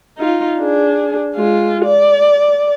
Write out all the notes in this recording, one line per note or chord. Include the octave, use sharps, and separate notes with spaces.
D#4 F4
D4 G#4
G#3 F4
D5